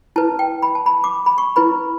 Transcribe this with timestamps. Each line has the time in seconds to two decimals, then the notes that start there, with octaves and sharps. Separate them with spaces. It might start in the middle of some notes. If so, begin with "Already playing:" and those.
0.16 E4 B4 A5
0.39 G5
0.63 B5
0.75 A5
0.86 B5
1.04 D6
1.26 B5
1.38 C#6
1.56 E4 B4 B5